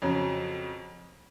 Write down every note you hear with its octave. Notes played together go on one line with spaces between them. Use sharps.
F2 C#3 F#3